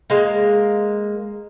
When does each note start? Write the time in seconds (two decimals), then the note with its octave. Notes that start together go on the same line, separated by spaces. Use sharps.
0.10 G#3 A#3